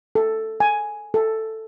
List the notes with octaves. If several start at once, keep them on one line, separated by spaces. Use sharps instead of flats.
A4
G#5
A4